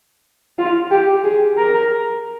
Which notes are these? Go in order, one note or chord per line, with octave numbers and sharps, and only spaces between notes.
F4
G4
G#4
A#4